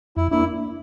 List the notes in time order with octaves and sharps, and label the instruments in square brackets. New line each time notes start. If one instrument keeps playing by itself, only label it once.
[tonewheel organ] F2 [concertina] E4
[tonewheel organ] A#3 D4 [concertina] E4